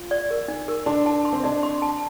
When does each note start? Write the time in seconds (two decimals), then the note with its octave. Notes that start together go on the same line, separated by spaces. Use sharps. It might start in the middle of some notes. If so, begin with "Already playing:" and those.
Already playing: F4
0.11 D5
0.31 A#4
0.48 D#4
0.68 A#4
0.86 D4 C6
1.06 A5
1.25 C6
1.33 C4
1.44 D4 D#5
1.63 C6
1.82 A5